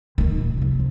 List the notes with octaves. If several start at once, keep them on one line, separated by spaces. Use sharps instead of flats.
D#3 D#4
A#2 G3
C3 F3
F3 C4